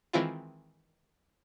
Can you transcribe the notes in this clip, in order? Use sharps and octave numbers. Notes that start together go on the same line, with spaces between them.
D#3 E3 G#3 C4 E4 F4